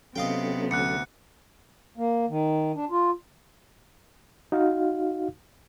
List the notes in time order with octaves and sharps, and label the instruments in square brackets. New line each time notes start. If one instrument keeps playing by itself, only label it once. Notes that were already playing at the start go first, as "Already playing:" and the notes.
[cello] C3 B3 [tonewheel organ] F#3 C#4 A4 [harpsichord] D#5 F5 G5
[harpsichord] D2 [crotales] F#6 C#7
[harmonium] A#3
D#3
D4
F4
[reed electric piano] D#4 F#4 F5